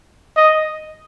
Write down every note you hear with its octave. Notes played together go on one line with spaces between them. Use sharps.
D#5